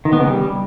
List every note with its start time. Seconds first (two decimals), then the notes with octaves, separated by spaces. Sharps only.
0.05 D#3
0.13 B3
0.20 C#3
0.27 G3